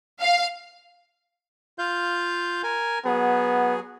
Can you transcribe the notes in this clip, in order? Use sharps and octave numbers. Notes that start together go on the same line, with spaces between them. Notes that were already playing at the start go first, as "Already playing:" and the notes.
F5
F4 F5 G6
A#4 G#5
F#3 B3 G#4